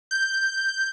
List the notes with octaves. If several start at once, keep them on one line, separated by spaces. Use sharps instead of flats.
G6